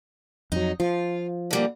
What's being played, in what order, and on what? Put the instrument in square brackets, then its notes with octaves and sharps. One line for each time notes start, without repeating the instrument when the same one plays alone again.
[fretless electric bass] F2 F#3 [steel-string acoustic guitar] D#4
[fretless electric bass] F3 [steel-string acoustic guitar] F4
[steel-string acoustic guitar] D3 G3 A#3